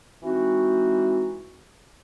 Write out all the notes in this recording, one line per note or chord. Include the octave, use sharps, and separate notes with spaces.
E3 G#3 C4 D#4 F#4